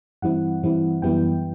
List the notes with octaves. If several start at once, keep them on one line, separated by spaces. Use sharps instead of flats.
G2 E3 G3 C4 E4 F#5
G2 E3 G3 C4 E4
F#2 E3 G3 B3 E4 G5